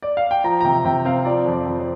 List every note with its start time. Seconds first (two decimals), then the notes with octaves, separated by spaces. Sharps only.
0.02 D5
0.17 F5
0.31 G5
0.44 F3 A#5
0.61 A#5
0.64 C3 G5
0.85 C3 G5
1.05 C4 F5
1.25 F3 D5
1.46 F2
1.53 D5
1.66 F2
1.80 C5